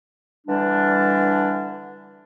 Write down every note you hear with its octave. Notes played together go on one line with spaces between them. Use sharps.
D3 E3 G3 D4